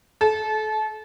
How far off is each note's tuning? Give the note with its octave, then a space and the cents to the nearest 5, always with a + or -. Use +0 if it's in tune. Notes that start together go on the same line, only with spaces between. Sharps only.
A4 -30